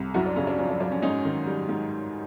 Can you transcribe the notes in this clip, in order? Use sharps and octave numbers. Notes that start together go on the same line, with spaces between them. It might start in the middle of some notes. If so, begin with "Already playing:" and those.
Already playing: C2
F#2 E4 F#4
D4
C#3 C#4
D4
F3 C#4
D4
F#2 D4
C#4
G#2 C#4 D#4
D#3
G3
G#2